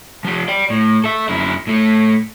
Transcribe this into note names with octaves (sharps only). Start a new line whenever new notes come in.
F3 G4
D5 G5
A2
A4 E5
F#2 E4
A2 A3